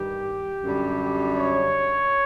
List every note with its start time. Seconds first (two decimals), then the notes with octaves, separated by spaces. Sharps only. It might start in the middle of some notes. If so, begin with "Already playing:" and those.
Already playing: G2 D#3 G3 G4
0.63 F#2 D3 G3
1.37 C#5